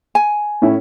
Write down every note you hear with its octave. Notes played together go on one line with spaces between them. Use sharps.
G#5
A2 C#4 E4